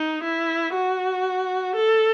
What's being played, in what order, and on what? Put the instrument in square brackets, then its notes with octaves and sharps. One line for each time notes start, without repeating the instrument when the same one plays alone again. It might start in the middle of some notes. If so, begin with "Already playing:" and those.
Already playing: [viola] D#4
E4
F#4
A4